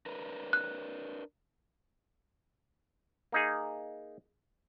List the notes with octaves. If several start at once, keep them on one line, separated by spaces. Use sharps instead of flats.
D4 A#4 B4
F#6
A#3 D#4 G#4